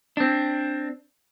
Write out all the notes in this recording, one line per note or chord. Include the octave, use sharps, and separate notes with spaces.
C4 D4